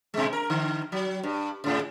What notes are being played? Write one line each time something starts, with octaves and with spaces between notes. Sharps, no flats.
B2 G#3
A#4
D3
F#3
G2
G#2 C#3